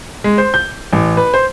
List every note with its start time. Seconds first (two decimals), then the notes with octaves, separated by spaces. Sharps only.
0.24 G#3
0.38 C5
0.54 G6
0.93 A1
1.17 B4
1.34 C5